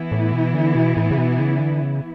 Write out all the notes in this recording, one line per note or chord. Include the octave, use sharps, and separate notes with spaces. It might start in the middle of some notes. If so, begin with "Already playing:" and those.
Already playing: E3 B3 E4
A2
B2
D3
B2
A2
C#3
B2
C#3
D3
C#3